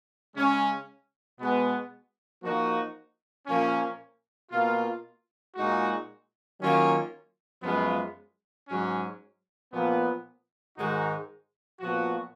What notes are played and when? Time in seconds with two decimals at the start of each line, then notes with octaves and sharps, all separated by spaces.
0.34 C#3 G#3 C#4
1.39 B2 G#3 B3
2.42 F3 A#3 D#4 F#4
3.47 A#2 F3 A#3 C#4
4.51 B2 A#3 F4
5.55 A#2 G#3 D#4 F#4
6.59 D#3 F#3 A#3 C#4 F4
7.63 F#2 F3 G#3 B3 F4
8.67 G#2 F#3 C#4
9.72 A#2 F3 B3
10.76 G#2 D#3 G#3 D#4 F#4
11.80 A#2 F3 B3 F#4